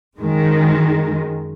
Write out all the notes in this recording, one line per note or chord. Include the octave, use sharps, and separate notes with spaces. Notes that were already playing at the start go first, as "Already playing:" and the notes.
F#2 D#3 G#3